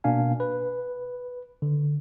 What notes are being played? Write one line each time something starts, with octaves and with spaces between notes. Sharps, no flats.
B2 A#3 D4 F5 G#5
B4
D3